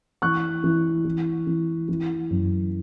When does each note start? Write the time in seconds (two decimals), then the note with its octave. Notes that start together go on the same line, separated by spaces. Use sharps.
0.22 E3 C#6 F#6
0.64 E3
1.05 E3
1.47 E3
1.89 E3
2.30 F#2